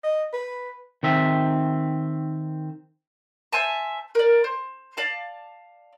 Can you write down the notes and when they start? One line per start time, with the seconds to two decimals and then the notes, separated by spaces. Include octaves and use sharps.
0.04 D#5
0.33 B4
1.03 D#3 C4 E5
3.52 C5 E5 G#5 A5
4.15 A#4 D5
4.44 C5
4.97 D5 F5 A5